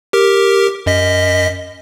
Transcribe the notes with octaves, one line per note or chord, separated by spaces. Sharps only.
G4 A#4
F#2 D#5 B6